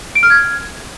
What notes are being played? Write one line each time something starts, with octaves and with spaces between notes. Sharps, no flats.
D7
F6
G#6